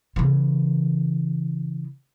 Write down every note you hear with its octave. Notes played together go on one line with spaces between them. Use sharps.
C#3 E3